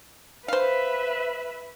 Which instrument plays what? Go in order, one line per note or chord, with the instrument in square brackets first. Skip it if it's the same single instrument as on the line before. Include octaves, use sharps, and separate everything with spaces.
[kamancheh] B4 E5 [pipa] C5 F5